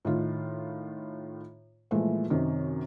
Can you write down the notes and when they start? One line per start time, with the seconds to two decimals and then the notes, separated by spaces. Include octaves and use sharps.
0.05 A2 D#3 F4
1.91 A#2 E3 F3 G#3 A3
2.30 F#2 C3 D#3